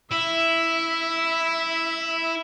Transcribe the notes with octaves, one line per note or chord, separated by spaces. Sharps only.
E4 E5